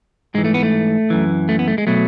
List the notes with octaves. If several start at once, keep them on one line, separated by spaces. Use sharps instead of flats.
G#2 E3 G#3
A3
B3
A3
F#2 E3
A3
B3
A3
G#3
B2 F#3 A3